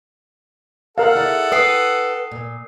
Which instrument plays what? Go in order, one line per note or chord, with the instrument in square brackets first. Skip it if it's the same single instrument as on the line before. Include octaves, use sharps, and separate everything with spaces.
[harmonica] A4 F#5 [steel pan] A#4 F5
[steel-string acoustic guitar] E4 G#4 D5
[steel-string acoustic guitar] B4 G5 [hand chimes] D#6 C7
[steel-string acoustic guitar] A#2